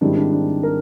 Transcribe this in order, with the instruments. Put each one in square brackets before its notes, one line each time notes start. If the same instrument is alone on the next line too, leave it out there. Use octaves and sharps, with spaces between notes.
[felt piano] G#2 D#3 G3 C4 E4 [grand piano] D4
[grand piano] D4
D4
A#4